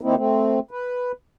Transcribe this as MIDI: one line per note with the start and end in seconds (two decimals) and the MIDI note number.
0.01 0.15 51
0.01 0.15 58
0.01 0.15 60
0.01 0.15 63
0.01 0.15 64
0.16 0.59 57
0.16 0.59 60
0.71 1.12 71